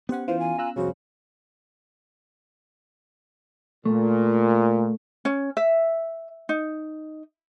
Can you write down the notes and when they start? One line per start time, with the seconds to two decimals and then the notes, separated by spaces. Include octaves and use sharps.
0.09 B3 C#4 G4 C5 F#5
0.28 E3 F4 C5
0.40 G#5
0.58 F4 A#5 E6 F#6
0.76 C2 F2 C#3 F#4 C5
3.85 A#2 A3
5.25 C#4
5.57 E5
6.49 D#4